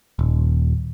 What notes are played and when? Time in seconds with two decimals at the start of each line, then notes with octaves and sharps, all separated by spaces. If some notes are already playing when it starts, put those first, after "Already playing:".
0.19 D#1